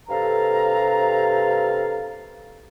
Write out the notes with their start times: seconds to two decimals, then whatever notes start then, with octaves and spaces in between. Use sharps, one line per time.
0.08 G2 C3 A4 F5 A#5